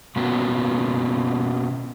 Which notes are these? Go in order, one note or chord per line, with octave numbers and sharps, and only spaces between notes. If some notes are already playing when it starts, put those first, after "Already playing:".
B2 A#3 B3 C#4 F4 F#4